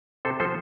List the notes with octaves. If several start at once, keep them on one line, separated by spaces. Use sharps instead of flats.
C3 A4 C5
F3 C4 A4 C5